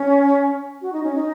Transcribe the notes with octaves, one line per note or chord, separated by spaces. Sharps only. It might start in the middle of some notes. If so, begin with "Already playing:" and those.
Already playing: C#4
F#4
D#4
C#4
D#4